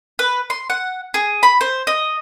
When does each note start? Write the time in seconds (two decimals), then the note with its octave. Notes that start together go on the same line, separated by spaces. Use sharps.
0.19 B4
0.50 C6
0.70 F#5
1.14 G#4
1.43 B5
1.61 C5
1.87 D#5